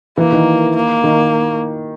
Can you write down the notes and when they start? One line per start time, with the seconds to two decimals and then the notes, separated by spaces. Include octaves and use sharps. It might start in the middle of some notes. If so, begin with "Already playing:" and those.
0.18 E3 A#3
0.32 D#3
0.75 A#3
1.04 D#3